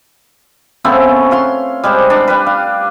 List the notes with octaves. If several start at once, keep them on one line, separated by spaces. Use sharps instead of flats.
C#3 A3 B3 C4
C#5 F5 C6
G3 G#3 G4 C5
D4
G3 B4
F5